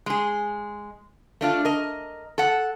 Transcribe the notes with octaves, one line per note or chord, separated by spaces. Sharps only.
G#3 G#4
A3 D4 F4
A#4 D#5
A4 F#5